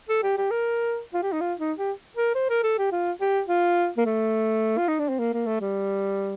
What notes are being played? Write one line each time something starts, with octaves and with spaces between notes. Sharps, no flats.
A4
G4
G4
A#4
F4
G4
D#4
F4
D#4
G4
A#4
C5
A#4
A4
G4
F4
G4
F4
A#3
A3
F4
D#4
D4
C4
A#3
A#3
A3
G3